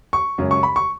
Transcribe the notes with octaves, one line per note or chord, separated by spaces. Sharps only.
C#6
F#2 C#3 G#3 C#4
C#6
B5
C#6